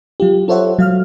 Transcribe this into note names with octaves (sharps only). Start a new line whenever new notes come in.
F#3 F4 G4
F4 A4 C5 C#5 E5 F#5
F#3 F5 F6